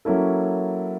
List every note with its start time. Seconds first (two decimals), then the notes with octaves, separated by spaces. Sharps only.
0.05 F#3 A#3 C#4 E4 A4